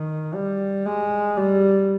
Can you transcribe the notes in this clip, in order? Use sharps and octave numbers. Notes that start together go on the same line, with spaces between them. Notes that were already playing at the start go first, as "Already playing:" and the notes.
Already playing: D#3
G3
G#3
G3